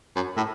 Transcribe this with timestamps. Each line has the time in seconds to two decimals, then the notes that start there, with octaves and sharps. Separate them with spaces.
0.15 F#2
0.36 A2